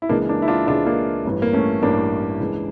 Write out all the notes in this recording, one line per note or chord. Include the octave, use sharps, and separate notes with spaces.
E4
C#2 C#3 E3 A#3 D4
A#3 D4
E4
D4 F4
C#2 C#3 E3 D4 F4
A#3 D4
A1 G2 E3
A#3
A3 C#4
A1 G2 E3 A#3 D4
C#2 C#3 E3